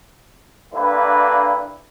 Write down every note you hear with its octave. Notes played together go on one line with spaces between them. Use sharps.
G2 D3 A#3 E4 B4